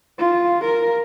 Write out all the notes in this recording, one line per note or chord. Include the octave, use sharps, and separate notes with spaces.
F4
A#4